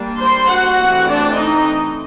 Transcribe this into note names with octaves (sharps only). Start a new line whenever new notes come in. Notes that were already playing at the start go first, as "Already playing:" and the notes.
Already playing: G3 A#3 D4
C5 C6
F#4 F#5
E3 A3 C4
D4 D5
D#4 D#5